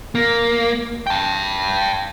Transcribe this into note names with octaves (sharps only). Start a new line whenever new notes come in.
A#3
G5 A5